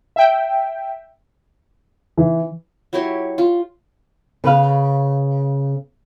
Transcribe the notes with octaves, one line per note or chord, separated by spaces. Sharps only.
E5 G5
E3
F#3 E4 G4 C#5
F4
C#3 B4 F5